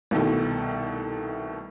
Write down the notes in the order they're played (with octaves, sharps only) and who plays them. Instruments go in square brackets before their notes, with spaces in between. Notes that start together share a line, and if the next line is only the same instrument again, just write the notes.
[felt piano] C2 B2 D#3 A3